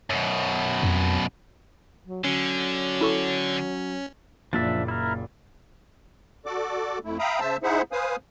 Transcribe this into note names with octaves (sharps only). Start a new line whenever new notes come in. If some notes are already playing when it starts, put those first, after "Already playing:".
F#2 B2
F2
F#3
D3 F#3 C#4
E4 A4 C#6
F#1 A#2 F3 D4 E5 A6
E4 A#4
F#4 A4 D5 D6
F2 A3 E4
E5 F5 G5 A#5 B5 D#6
C#3 C5 E5 A5 E6
D#4 E4 G#4 C5 E5 F#5
B4 C5 F5 G#5 D#6